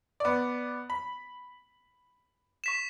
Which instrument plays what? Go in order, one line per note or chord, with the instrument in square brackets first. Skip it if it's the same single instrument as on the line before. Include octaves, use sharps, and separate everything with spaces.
[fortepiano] B3 D5
B5
[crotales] C#6 B6 E7